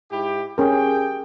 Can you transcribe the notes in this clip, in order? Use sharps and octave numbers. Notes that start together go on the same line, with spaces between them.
G#2 E4 G4
C#4 G4 G#4 A#4 G5